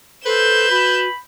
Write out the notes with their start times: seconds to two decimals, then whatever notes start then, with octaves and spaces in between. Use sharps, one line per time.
0.26 A4 B4 C5 G6 E7
0.71 F#4 B5